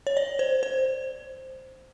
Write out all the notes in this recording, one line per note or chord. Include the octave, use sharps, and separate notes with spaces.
C#5
D5
C5
C5